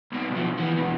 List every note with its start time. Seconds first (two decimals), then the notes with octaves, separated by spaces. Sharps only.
0.12 C2 B2
0.31 B1 F3
0.59 E3 B3
0.77 E2 B2